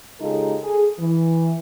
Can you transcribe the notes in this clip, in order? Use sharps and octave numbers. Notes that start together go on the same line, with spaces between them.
C#3 G#3 D#4 F4 G4 A4
G#4 A4
E3